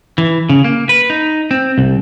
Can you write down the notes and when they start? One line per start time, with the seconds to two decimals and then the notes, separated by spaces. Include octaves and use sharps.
0.18 E3
0.49 C#3
0.64 A#3
0.89 B4
1.10 D#4
1.51 C4
1.78 C2